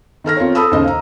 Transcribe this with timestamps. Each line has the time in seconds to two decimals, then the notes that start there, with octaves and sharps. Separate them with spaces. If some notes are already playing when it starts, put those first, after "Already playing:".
0.24 D#3 A4 F6 A#6
0.37 C4 F4 A#4 C#5
0.55 A4 A5 B5 D#6 E6
0.71 D#2 C#3 C5 D#5
0.84 F5 A#5